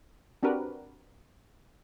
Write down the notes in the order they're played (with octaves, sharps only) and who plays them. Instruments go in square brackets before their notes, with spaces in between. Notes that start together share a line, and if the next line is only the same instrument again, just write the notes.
[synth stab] C4 D4 F#4 G4 A#4 B4